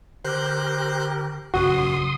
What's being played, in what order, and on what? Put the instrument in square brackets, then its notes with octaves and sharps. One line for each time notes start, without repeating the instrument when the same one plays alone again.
[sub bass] D3 [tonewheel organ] G4 A#4 [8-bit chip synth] C5 F#6 G6
[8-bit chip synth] A#1 F#2 [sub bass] C#3 [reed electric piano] F#4 [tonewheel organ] C6 D#6